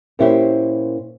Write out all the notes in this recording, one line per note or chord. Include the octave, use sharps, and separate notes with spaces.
A#2 C#4 E4 G4 C5